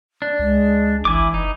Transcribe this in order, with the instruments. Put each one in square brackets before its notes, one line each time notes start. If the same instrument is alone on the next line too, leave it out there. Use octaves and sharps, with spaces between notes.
[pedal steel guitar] D4
[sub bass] C#2 [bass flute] G#3
[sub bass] G#1 [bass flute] E3 [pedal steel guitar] E4 G#5 D6
[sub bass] F#1 [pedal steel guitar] D#4